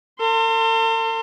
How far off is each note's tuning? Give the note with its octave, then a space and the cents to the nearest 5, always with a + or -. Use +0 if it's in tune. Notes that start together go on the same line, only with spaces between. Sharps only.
A4 +45 C6 +0